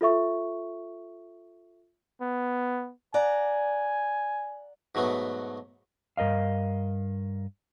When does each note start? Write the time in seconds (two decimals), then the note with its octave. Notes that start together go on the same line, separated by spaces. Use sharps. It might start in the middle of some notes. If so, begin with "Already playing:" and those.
0.01 F4 A4 E5 C#6
2.21 B3
3.14 D5 F#5 G#5 A#5
4.95 G#2 B2 F#3 A3 B3
6.17 G2 A#4 D#5 F5